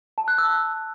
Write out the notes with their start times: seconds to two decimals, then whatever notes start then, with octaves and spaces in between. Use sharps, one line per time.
0.18 A5
0.28 F#6
0.38 E6